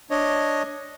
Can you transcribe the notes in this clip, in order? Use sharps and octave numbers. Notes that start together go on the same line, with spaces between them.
D4 C#5 D#5